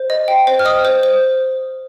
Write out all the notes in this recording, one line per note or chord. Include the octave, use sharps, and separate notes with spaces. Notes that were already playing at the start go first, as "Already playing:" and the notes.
Already playing: C5
D#5
G5
C5
F6
D#5 D#6
C5
C5